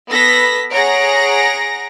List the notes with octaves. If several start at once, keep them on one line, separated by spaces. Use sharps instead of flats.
B3 A4 B4 A#6 B6
G#4 C#5 F#5 A#5 A#6 D7